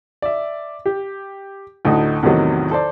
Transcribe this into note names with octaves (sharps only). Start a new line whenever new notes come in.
D5 E5
G4
D2 A2 D#4 F#4 D#6
E2 A2 C3 D#3 F#3
A4 C5 D5